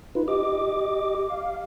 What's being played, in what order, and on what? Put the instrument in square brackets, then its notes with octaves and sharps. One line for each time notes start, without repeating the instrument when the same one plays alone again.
[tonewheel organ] D#4 F4 B4
G4 D#5 D6
F5